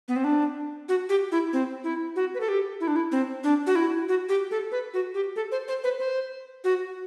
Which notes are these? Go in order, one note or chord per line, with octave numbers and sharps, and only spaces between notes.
B3
C4
D4
F#4
G4
E4
C4
E4
F#4
B4
A4
G4
E4
D4
E4
C4
D4
F#4
E4
F#4
G4
A4
B4
F#4
G4
A4
C5
C5
B4
C5
F#4